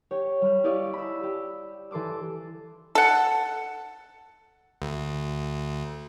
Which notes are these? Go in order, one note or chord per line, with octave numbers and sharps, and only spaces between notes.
G4 C#5
G3 B5 F6
E4 G4 D5 D#5 F5 C#6
B5 E6
G4
E3 A4 C6 D6 E6
A4 F#5
D2